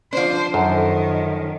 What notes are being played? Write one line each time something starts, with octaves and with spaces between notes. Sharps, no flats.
F3 D4 C5
F#2 D#3 A4